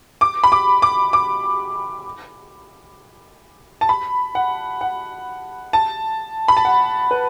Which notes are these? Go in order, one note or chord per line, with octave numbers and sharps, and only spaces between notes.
D6
B5
D6
D6
D6
A5
B5
F#5
F#5
A5
B5
A5
F#5
B4